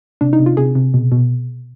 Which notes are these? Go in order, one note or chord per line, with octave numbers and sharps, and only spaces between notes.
C3 D4
D#4
C3
F4
C3 G#4
C3
B2
B2